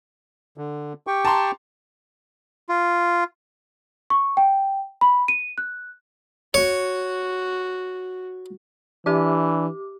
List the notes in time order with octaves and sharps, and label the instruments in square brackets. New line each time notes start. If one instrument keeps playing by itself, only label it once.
[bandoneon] D3
G4 G5 C#6
[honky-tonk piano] A5 A#5 C6
[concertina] F4
[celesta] C#6
G5
B5
D#7
F#6
[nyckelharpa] F#4 [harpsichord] C#5
[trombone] E3 [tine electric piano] D4 [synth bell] G4 D6